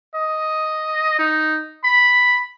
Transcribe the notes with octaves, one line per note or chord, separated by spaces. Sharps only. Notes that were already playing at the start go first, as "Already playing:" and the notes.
D#5
D#4
B5